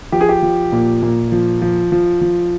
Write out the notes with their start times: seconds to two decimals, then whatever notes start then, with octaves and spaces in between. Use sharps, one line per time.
0.12 F3 G4
0.21 G#4
0.29 G4
0.43 F3
0.72 A#2
1.03 A#2
1.32 F3
1.62 F3
1.92 F3
2.21 F3